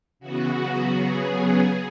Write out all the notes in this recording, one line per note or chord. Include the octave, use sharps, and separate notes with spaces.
C#3 E3 B3 F#4
C#3 F#3 B3
C#3 F#3 B3 G#4
C#3 F#3 B3